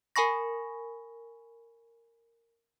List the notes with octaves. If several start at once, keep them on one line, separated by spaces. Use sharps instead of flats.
A#4 G#5 B5 C#6 A#6